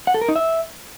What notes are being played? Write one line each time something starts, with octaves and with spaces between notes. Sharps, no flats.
F#5
A4
A#4
D#4
E5